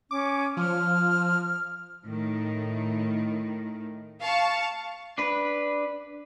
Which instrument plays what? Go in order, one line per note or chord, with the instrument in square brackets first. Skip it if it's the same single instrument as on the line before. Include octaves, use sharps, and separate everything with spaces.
[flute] C#4 [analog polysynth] D6
[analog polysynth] F3 [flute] F6
[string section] A2 D#3
F5 A5 C#6
[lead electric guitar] D4 B4